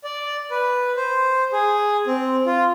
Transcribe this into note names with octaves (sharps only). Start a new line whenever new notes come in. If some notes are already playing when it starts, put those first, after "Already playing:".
D5
B4
C5
G#4
C4
F4